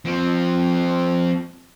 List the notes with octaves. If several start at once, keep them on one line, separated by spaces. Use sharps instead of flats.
F3 C4